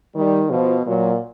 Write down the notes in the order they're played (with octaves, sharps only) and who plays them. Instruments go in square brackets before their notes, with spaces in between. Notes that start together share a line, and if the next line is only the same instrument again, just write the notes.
[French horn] D#3 [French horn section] G3
[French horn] B2 [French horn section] F3
[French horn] A#2 [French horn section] F#3